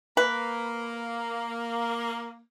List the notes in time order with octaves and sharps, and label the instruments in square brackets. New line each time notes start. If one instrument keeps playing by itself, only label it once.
[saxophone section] A#3 [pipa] B4